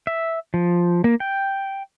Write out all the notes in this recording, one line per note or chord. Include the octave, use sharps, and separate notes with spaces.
E5
F3
A#3
G5